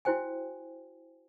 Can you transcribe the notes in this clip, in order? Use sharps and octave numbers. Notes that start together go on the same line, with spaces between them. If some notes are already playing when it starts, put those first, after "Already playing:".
E4 F#4 C5 G5 G#5